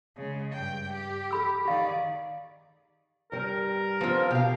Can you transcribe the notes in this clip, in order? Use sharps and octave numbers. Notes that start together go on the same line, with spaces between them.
C#3 G#3
G2 G5
G4
G#4 B5 E6
D#3 G4 D5 F5
G2 G3 A#4
F3 B3 C4 F4
B2 G4 F5